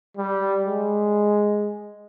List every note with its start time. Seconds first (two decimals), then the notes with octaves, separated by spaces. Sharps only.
0.17 G3
0.66 G#3